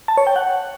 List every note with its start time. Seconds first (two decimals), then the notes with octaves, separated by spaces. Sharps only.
0.08 A5
0.17 C#5
0.27 G5
0.36 F#5